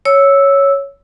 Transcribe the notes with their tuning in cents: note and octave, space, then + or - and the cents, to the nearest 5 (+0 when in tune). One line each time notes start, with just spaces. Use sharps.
C#5 +0 E6 -5